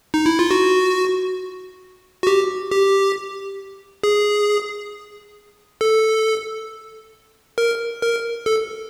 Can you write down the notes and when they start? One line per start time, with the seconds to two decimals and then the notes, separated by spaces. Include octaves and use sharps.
0.14 D#4
0.26 E4
0.39 F4
0.51 F#4
2.23 F#4
2.27 G4
2.71 G4
4.03 G#4
5.81 A4
7.58 A#4
8.02 A#4
8.46 A4